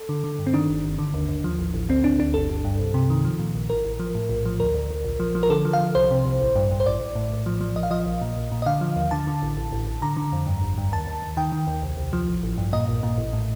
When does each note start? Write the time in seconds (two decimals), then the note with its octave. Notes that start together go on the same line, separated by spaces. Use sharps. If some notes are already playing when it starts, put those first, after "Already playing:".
Already playing: A4
0.09 D3
0.24 D3
0.39 G2
0.47 C4
0.54 D#3 D4
0.69 G1
0.84 G1
0.99 D3
1.14 D#2
1.29 D#2
1.44 F3
1.59 A1
1.74 A1
1.89 D2 C4
2.04 D2 D4
2.19 D2 D4
2.34 G1 A4
2.49 G1
2.64 G2
2.79 C2
2.94 C3
3.10 D#3
3.25 F3
3.39 A#2
3.55 A#1
3.70 A1 A#4
3.85 A1
4.00 F3
4.15 A2
4.29 A#1
4.45 F3
4.60 D2 A#4
4.74 D2
4.91 D2
5.05 A#1
5.20 F3
5.35 F3
5.43 A#4
5.50 D3 A4
5.65 F3
5.73 F5
5.81 F3
5.95 C2 C5
6.11 C3
6.26 C2
6.40 A1
6.55 G2
6.71 G2
6.80 C5
6.86 A1 D5
7.01 A1
7.15 A2
7.31 A#1
7.46 F3
7.61 F3
7.76 A#1 D#5
7.83 F5
7.91 F3 D#5
8.06 A#1
8.21 A#2
8.37 A#1
8.52 A#2
8.62 D#5
8.66 D3 F5
8.81 F3
8.96 D#2
9.11 D3 A5
9.27 D3
9.42 A1
9.57 A1
9.72 A1
9.87 A1
10.02 D3 A#5
10.17 D3
10.32 F2
10.47 G2
10.62 G1
10.78 G2
10.92 D#2 A5
11.07 D#2
11.22 D#2
11.37 D#3 G5
11.52 D#3
11.67 D#2
11.82 C2
11.97 C2
12.13 F3
12.28 A1
12.43 A1
12.58 G2
12.73 A#2 D#5
12.88 A#1
13.03 A#2
13.18 A1
13.33 A2